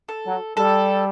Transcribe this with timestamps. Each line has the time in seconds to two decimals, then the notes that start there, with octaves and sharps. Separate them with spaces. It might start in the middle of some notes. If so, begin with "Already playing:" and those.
0.09 A4
0.25 F#3
0.56 G3 A4